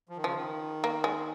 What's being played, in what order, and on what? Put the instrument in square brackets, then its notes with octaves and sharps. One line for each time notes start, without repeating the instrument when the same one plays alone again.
[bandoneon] F3
D#3
[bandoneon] C#3 [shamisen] F3
[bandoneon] D#3
[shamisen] A#3
G#3